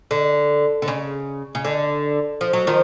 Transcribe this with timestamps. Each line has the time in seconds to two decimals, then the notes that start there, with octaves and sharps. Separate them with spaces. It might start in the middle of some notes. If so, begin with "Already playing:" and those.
0.11 D3
0.82 D3
0.88 C#3
1.55 C#3
1.65 D3
2.41 F3
2.53 F#3
2.67 D#3 F3